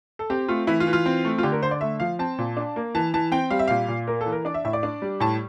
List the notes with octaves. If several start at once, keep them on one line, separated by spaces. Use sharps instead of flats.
A4
C4 G4
A3 F4
E3 E4
F4
E3
F4
C4
A3
F4
D3 G4
A#4
D3 C5
D5
A3 E5
F3 F5
C4 A5
A#2
D4
A#3
E3 A5
E3 A5
C4 G5
G3 F5
E5
A#2 F5
A#2
A#3 A#4
A4
E3
A#4
D4 D5
E5
A2 E5
D5
D4
G3
A2 A5